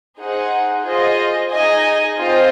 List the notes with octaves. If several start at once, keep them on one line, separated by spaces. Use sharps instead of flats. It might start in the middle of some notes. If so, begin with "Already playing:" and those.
D#4 G#4 C5 F#5
F4 G#4 C5 D#5
D#4 G#4 D#5 G#5
C4 F4 C5 D#5